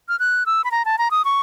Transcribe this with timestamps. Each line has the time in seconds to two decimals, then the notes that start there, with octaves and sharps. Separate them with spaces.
0.09 F6
0.19 F#6
0.46 E6
0.64 B5
0.71 A#5
0.85 A5
0.98 A#5
1.11 D#6
1.25 C#6